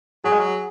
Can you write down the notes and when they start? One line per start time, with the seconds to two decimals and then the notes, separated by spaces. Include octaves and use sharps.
0.24 F#3 G#4
0.32 G#3
0.39 F#3